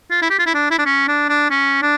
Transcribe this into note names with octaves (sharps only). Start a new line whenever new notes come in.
F4
E4
G4
F4
E4
D4
E4
D4
C#4
D4
D4
C#4
D4